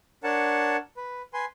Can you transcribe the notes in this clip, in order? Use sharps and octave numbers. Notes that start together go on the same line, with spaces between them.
D4 A#4 C#5 F#5 A5
B4
B4 G#5 C6